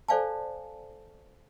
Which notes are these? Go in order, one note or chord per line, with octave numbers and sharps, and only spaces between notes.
A4 C5 D5 F5 G#5 A5